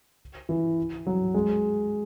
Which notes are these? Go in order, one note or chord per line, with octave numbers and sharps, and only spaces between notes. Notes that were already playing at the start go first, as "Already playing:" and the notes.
E3
F#3
G#3